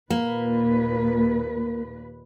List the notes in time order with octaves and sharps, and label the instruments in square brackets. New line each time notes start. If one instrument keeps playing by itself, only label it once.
[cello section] D#2 A#2 B4 [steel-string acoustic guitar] A#3